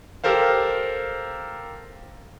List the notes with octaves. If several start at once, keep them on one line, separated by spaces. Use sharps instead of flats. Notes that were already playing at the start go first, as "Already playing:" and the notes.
G4 A4 A#4 C5 F5